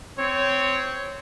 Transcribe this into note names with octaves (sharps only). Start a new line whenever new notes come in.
C4 C#5